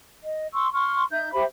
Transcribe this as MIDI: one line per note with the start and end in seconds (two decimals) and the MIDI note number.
0.24 0.47 75
0.53 0.68 84
0.53 0.68 85
0.53 0.68 88
0.74 1.04 84
0.74 1.04 85
0.74 1.04 89
1.11 1.33 63
1.11 1.33 76
1.11 1.33 91
1.34 1.44 67
1.34 1.44 72
1.34 1.44 76
1.34 1.44 83